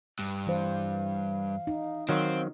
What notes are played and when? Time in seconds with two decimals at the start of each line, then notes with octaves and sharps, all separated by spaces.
0.19 G2
0.47 E3 C5 F5
1.67 D#4
2.09 D#3 F#3 C4 C5 F5